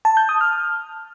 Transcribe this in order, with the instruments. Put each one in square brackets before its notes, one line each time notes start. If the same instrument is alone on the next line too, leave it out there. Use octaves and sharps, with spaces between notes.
[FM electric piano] A5
G6
D#6
F6